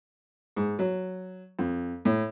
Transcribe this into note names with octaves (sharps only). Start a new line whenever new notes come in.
G#2
F#3
F2
A2